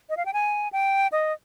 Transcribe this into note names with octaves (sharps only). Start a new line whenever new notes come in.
D#5
F5
G5
G#5
G5
D#5